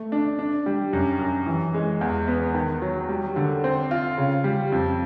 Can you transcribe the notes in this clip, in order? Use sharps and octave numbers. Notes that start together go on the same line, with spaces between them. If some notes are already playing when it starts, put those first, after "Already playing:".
Already playing: A3
D4
D4
G3
F#2
F#2
E3
G#3
E2
B3
D#3
F#3
G3
D3
C4
F4
C#3
G3
F2